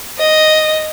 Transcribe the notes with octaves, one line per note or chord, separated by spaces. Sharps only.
D#5